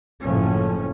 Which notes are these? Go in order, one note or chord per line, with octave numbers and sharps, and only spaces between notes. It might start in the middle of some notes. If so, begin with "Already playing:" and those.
F#1 A2 F3 C#4